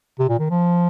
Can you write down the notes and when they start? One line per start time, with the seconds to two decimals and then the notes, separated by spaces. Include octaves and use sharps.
0.19 C3
0.29 A#2
0.39 D#3
0.50 F3